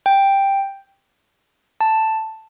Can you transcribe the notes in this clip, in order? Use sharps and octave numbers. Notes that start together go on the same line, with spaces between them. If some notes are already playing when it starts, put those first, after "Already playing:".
G5
A5